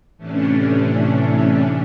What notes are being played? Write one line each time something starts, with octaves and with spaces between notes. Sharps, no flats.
A2 C3 E3 A3 C#4 D4